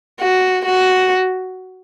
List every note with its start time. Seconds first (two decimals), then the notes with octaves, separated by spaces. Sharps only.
0.20 F#4
0.65 F#4